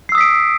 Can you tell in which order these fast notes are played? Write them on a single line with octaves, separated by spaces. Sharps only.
C7 E6 D#6 B6 D7